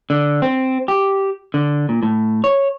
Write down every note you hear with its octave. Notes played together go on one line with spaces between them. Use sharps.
D3
C4
G4
D3
A#2
A2
C#5